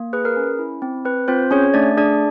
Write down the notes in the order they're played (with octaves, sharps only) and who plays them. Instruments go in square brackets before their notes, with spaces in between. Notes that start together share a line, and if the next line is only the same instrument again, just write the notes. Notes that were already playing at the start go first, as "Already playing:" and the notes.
Already playing: [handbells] A#3
G#4 B4
A#4
C#4
E4
C4
C4 B4
C4 F4 C5
C#4 G#4 C#5
A3 D4 D5
D4 G#4 D5